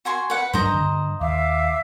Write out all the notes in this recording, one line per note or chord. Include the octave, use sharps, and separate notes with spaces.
F#4 G#5 C6
B4 F#5
G2 F#3 D4 C5 D#5 A#5
G2 D3
D#2 E5 F5 D6